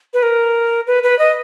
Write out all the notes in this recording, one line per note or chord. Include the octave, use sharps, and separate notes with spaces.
B4
A#4
B4
B4
D#5